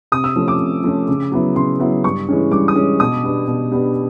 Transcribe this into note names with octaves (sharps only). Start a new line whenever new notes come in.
C3 D#6
E6
F3 A3 C#4
D6
C3
F3 A3 C#4
C#3
F#3 B3 E4
C#3 C6
F#3 B3 E4
G2 C#6
E3 G#3 C#4
G2 D6
D#6
E3 G#3 C#4
B2 D#6
G3 B3 D4
B2
G3 B3 D4